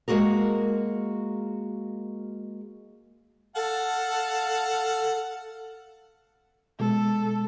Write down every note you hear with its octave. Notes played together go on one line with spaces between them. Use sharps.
G#3 A#3 C#4 F#4 G#4 A#4
A4 F5 F#5 A5
B2 G#3 A4